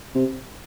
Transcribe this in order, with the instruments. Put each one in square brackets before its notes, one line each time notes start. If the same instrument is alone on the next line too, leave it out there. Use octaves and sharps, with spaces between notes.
[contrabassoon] C3